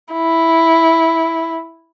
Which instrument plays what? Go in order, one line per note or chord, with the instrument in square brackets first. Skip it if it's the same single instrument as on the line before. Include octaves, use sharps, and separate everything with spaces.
[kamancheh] E4